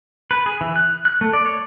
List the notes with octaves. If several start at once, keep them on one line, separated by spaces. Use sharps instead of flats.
B4
G#4
E3
F#6
F#6
A3
D5
C#5